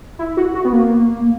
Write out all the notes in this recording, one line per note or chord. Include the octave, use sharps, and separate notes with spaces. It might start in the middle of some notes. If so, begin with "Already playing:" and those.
E4
F#4
F#4
B3
A#3